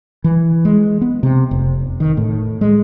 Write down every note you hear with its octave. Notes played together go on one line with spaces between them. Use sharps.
E3
G#3
B3
C3
F1
D#3
A2
G#3